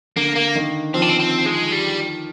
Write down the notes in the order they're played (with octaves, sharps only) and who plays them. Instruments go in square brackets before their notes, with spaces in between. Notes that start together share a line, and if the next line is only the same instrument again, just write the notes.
[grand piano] D3 [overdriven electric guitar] A#3
[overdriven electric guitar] A#3
[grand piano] D#3
[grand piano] F3 [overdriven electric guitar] C4
[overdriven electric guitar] D4
C4
C4
G#3
G3